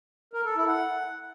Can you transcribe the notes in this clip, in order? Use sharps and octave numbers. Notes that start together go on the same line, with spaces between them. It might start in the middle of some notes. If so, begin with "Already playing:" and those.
A#4
A4
E4
F#5